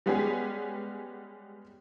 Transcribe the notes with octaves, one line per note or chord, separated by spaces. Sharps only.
G3 G#3 B3 C#4 G4 G#4